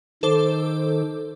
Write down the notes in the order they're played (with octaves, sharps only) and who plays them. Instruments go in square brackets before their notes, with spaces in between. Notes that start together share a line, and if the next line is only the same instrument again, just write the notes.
[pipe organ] D#3 [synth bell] A4 C5 D6